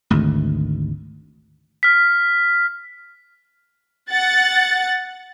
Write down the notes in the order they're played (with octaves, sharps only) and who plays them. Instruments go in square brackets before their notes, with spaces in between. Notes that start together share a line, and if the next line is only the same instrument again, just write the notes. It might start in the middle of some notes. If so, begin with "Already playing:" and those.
[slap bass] G#1 D2
[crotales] F6 B6
[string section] F#5 A6